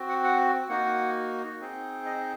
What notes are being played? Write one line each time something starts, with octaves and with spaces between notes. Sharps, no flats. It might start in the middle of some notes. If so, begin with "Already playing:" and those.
Already playing: C4 F#4
F#5
F#5
A#3 D#4 F#4 F#5
C4 D#4 G#4
D#5